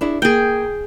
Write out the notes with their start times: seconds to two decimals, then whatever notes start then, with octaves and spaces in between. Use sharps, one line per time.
0.01 D4 E4 G#4
0.22 A#3 G#4 G5